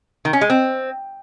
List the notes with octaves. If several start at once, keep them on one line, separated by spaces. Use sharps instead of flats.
D#3
C#4
G#3
C4